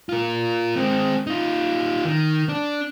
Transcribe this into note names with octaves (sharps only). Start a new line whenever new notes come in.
F4 A#4
G#3 C4
D#4 F4
D#3
D4